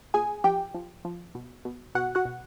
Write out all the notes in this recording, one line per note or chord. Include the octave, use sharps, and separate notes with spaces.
A#2 G#4 G#5
F3 G4 G5
F3
F3
B2
B2
B2 F#4 F#5
F#4 F#5
B2